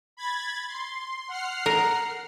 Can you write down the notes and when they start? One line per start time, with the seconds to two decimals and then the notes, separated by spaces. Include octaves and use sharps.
0.17 B5 G#6 A6
0.68 C6
1.28 F#5 F6 C7
1.66 A#4